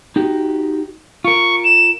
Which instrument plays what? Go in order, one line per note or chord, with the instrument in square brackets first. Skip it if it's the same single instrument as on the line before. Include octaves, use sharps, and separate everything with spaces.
[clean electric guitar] D#4 F#4 G4
[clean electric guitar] F4 A#4 [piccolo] C#6
[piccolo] E7